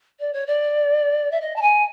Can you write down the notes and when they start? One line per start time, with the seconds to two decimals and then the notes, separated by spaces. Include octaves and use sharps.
0.19 D5
0.33 C#5
0.46 D5
1.31 E5
1.41 D#5
1.56 A5
1.62 G#5